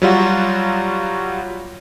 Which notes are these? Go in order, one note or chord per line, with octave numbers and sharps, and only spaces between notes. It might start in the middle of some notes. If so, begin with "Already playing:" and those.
F#3 G3 F4 F#4